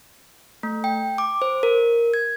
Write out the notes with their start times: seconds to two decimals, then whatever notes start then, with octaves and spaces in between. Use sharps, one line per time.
0.63 A3
0.84 G5
1.18 D6
1.42 C5
1.63 A#4
2.14 G#6